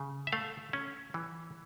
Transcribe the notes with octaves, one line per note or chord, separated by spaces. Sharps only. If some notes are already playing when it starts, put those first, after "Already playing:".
Already playing: C#3
E5
A3 F5
C#4
E3